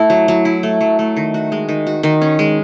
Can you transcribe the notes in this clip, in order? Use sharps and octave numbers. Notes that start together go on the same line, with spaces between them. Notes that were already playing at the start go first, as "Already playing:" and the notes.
Already playing: A3 E4
F#3
F#3
E4
A3
F#3
A3
D#3
F#4
G#3
D#3
F#4
D#3
C#4
G#3